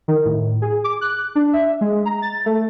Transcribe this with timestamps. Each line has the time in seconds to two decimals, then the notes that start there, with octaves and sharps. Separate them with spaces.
0.08 D#3
0.25 A2
0.62 G#4
0.84 D6
1.01 F#6
1.35 D4
1.53 E5
1.81 G#3
2.05 A#5
2.22 A6
2.46 A3